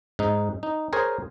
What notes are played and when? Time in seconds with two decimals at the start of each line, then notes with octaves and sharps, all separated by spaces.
0.19 G#2 D#4
0.63 D#4
0.93 G#4 A#4 C5 C#5 G#5